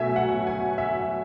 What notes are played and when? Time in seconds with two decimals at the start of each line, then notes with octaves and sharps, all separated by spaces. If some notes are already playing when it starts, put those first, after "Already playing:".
Already playing: B2 F#3 A3 E5 G#5
0.16 F#5
0.47 G#5
0.78 E5